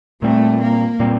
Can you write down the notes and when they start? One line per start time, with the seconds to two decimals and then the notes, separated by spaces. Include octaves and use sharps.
0.22 A#2 G3 A3 C4
0.60 A#3
1.00 A#2 G3 C4